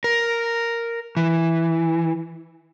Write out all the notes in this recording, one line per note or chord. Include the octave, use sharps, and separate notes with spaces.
A#4
E3